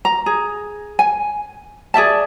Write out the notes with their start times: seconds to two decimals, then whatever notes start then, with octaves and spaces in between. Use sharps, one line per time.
0.05 A#5
0.26 G#4
0.99 G#5
1.94 G#4 D5 E5 A5